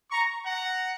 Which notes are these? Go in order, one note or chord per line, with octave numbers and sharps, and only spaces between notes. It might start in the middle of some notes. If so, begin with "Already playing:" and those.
A#5 C#6
F#5 A#5